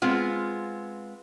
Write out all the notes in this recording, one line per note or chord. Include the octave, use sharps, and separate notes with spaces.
G#3 B3 C4 F4